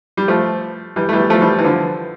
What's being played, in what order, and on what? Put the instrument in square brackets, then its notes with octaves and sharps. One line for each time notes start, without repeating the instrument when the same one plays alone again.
[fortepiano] G3
F3 A3
E3 G3
A3
E3 G3
F3 A3
E3 G3
E3
D3 F3